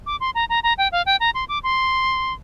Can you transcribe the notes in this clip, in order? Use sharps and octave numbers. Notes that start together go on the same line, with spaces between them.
D6
C6
A#5
A#5
A#5
G5
F5
G5
A#5
C6
D6
C6